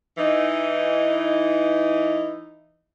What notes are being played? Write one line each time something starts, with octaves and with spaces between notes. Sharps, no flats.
E3 D#4